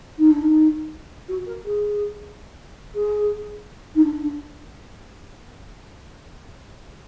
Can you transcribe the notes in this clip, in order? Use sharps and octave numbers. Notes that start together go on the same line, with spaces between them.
D#4
D4
D#4
F#4
A#4
G#4
G#4
D#4
D4
D4